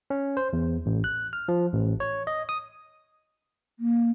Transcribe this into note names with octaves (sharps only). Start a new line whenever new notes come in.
C#4
C5
E2
A1
F#6
F6
F3
A1
C#5
D#5
D#6
A#3